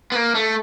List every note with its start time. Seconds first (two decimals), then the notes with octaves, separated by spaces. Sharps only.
0.12 B3
0.16 A#3
0.35 A3